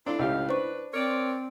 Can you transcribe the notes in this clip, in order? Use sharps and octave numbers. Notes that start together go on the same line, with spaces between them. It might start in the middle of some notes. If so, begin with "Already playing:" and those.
C4 D4 E4 F4 A4
C#2 A2 G4 D#5 F5
D4 B4 C5 C#6
C4 A#4 C#5 D5